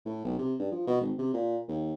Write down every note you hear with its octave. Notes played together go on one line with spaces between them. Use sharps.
A2
B1
C3
G2
F3
B2
G#1
C3
A#2
D#2